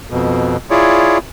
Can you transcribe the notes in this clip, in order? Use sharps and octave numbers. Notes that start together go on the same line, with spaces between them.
F2 B2
E4 F4 G#4 C#5 D5